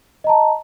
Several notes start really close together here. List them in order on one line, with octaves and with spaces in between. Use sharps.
D#5 A#5 A5